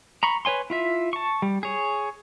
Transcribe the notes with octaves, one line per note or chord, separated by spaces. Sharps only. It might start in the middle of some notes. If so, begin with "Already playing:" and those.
A#5 B5 C#6
B4 C#5 G#5 C6
E4 F4 E5
A5 C#6
G3
G#4 C#5